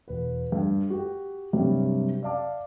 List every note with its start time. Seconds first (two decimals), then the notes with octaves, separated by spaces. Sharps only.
0.08 E1 B4
0.52 G2
0.90 F#4 G4
1.53 G2 C3 F#3 G3
2.23 D5 E5 F5 A5 D6